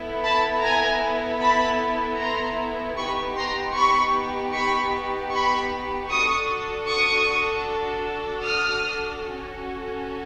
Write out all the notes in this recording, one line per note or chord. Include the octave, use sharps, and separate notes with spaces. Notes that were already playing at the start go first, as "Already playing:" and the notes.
Already playing: B3 E4 A4
A5 B5
G#5 A#5
A5 B5
A#5 C6
B3 D#4 G4 B5 C#6
A#5 C6
B5 C#6
B5 C#6
B5 C#6
D4 F#4 A4 C#6 D#6
C#6 D#6
D#6 F6
C#4 F#4 A4